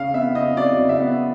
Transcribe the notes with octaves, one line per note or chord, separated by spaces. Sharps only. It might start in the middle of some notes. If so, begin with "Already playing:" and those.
Already playing: C#3 F5
B3 E5
C#3 D#5
F#3 D5
C#3
E5
B3